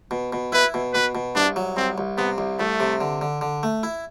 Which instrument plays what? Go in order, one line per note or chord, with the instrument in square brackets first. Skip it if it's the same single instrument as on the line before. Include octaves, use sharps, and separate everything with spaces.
[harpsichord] B2
B2
[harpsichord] E4 [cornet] B4
[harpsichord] B2
[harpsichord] B2 [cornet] B4
[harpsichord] B2
[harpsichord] C2 [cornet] D4
[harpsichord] F#3
[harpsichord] C2 [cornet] C4
[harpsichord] C2
[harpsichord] C3 [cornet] B3
[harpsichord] C2
[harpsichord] C2 [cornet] A3
[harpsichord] C3
D3
D3
D3
A3
E4